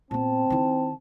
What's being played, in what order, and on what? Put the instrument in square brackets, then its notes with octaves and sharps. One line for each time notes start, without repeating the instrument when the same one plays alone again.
[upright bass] A#2 B3 [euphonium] C4 [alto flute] A5
[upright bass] D#3 E4